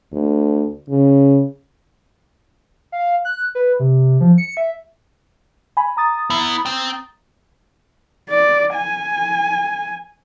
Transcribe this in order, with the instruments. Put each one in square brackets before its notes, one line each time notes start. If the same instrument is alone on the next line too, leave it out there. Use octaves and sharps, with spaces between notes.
[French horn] D2
C#3
[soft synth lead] F5
F#6
B4
C3
F3
C#7
E5
[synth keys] G#5 B5
A#5 D#6 A6
[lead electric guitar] B3 E4
C4 G5
[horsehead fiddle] D5
G#5